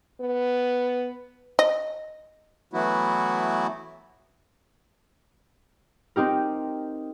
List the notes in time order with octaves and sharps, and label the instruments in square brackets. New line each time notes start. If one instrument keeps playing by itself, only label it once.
[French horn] B3
[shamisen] D#5
[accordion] E3 F#3 A3 B3 E4 F#4
[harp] C4 D#4 G4 A#4